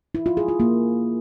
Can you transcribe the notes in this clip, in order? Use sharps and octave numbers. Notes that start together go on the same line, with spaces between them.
E4
F4
G#4
F4
A#3